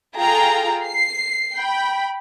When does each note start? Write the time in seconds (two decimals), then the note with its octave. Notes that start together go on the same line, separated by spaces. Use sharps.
0.17 F4 G#4 A4 F5 G5 A#5
0.85 C7
1.57 G5 B5